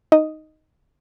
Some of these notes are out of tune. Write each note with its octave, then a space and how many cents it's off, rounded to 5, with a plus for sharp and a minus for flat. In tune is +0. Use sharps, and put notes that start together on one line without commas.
D#4 +0 D#5 +0